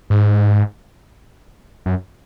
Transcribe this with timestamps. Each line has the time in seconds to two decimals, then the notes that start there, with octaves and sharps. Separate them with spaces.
0.10 G#2
1.86 F#2